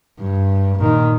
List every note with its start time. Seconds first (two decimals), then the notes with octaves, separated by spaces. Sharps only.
0.19 G2
0.80 A#2 D#3